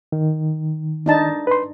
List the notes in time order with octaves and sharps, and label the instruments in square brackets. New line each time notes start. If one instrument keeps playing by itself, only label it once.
[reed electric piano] D#3
[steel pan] D4 D#4 A5
[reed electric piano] B4 C6